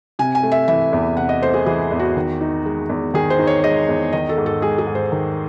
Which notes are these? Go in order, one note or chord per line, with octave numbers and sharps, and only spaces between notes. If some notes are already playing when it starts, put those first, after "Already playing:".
C3 G#5
G#5
A3
E5
E3 E5
E2
C3 F#5
D#5
A3 C5
G#4
E3 G#4
E2
F#4
D#3
D#4
G#3
E2
D#3 G#4
C5
D#4
C#5
G#3 D#5
E2
D#3 D#5
A4
G#2
A4
G#3 G#4
G#4
G#2
C5
D#3